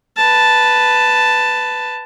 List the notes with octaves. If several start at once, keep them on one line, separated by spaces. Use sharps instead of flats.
B4 A5